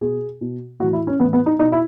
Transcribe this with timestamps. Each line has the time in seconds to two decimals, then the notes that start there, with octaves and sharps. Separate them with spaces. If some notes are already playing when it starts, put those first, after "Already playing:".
0.01 B2 G#4
0.41 B2
0.80 A2 F#4
0.83 E3
0.93 E4
1.07 C#4
1.20 A2 E3 B3
1.33 B3
1.46 D#4
1.59 B2 D#4
1.72 E4